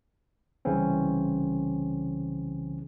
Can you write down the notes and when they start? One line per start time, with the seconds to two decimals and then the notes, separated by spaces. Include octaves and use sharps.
0.65 C2 C#3 E3 C4 C#4